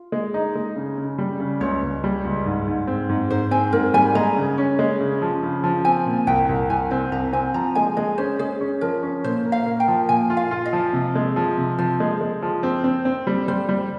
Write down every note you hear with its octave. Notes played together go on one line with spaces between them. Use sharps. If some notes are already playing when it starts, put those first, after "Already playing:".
Already playing: F4
G#3
D#4
G#3
C#3
C#3
G3
C#3
C#2 C#5
C#2
G3
C#2
G#2
G#2
C4
G#2
G#2 C5
C4 G#5
G#2 A#4
G3 G#5
G#3 A#5
C#3
C#4
G#3
C#3
F3
C#3
F3
C4 G#5
A#2
C2 G5
C2
C2 G#5
C4 G#5
C2 A#5
C4 G#5
F3 A#5
G#3 G#5
G#3 D#5
C#4 C5
G#3 G#4
C#4
F3 A#4
C#4
A#2 C5
A#3
F5
A#3
G5
F3
A#2 G#5
F4
F5
F4
D#5
F3
C3
G#3
F3
C3
F3 C5
G#3
G#3
F3
C4
C4
C4
G3
G3 C5
G3